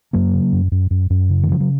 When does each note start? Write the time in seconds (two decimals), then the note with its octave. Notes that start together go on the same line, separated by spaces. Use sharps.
0.13 F#2 F#3 A#3
0.34 C#3
0.52 F#2
0.72 F#2
0.91 F#2
1.10 F#2
1.30 C#3
1.43 D#3
1.49 C#3 F3
1.60 F#3